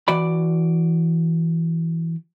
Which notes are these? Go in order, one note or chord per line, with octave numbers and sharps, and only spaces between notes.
E3 F#4 D5 B5